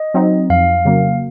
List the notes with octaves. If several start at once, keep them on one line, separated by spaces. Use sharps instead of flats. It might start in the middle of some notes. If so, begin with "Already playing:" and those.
Already playing: D#5
F#3 C4 D#4
F2 F5
C#3 F#3 A#3